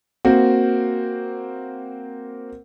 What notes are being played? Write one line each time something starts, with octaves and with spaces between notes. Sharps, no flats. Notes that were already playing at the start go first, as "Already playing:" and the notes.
A#3 C4 F#4